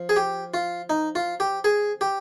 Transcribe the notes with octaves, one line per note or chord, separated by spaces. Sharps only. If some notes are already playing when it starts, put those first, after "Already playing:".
Already playing: F3
G#4
G4
F4
D#4
F4
G4
G#4
G4